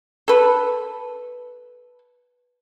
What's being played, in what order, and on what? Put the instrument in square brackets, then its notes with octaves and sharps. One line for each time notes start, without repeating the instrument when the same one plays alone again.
[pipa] A4 B4